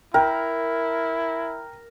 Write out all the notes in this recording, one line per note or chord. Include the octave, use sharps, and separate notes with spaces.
E4 A#4 G5